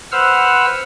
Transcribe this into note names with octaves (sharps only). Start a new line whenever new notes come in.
B4 C5 F#5 E6 F6